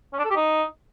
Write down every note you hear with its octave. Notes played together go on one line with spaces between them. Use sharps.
C#4
D4
A4
G4
D#4